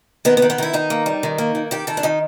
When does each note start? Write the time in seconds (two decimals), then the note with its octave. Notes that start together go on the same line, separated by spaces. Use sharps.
0.25 D#3 B3
0.37 B3
0.42 D#3
0.50 B3
0.58 D#3 E4
0.73 D#3 D#4
0.90 A#3
1.06 G3
1.23 D#3
1.38 A#3
1.55 D#3
1.71 D#3 G4
1.87 D#3 A4
1.97 D4
2.03 D#3 D#4